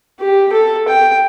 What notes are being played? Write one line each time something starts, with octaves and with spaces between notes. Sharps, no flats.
G4
A4
G5